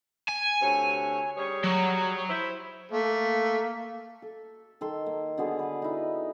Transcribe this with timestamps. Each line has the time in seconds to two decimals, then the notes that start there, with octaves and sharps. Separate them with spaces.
0.28 G#5
0.61 D2 C3 C#5
1.37 G3 G#4 C#5
1.64 F#3
2.29 E4 C5
2.91 A3 A#3
4.22 A4
4.81 D#3 A4 C6
5.06 A#3
5.37 D3 B3 F#4 G#4
5.59 B4 D6
5.82 D#4 E4